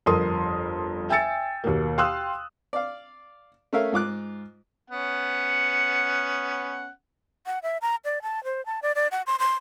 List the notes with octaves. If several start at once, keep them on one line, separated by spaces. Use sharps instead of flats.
G1 F2 A4 A#4 C6 D#6
E5 G5 G#5 E6 A6 C#7
D#2 B2 A#3
F5 G5 C6 D#6 E6 F#6
D5 F5
A3 C#4 A#4 E5 F5
G#2 F4 D6 F#6
B3 C#4 F#5
F#5
E5
A#5
D5
A5
C5
A5
D5
D5
F#5
C6
C6